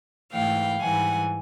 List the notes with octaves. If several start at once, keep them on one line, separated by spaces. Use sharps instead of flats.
G#2 E3 A3 F5 G5
G#2 E3 G3 F#5 G#5